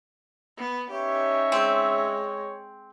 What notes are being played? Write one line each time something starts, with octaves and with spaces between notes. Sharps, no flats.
B3
C#4 D#4 G4 C#5 E5
G#3 C4